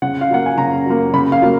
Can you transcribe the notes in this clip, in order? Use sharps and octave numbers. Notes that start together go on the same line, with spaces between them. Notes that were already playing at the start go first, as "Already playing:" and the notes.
C#3 F#5
F5
F#3 A#3 F#5
G#5
C#3 A#5
F#3 A#3
C#3 B5
F5
F#3 A#3